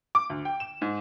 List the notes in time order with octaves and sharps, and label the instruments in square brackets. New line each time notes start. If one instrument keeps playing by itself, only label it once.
[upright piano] D6
D2
G5
E7
G#2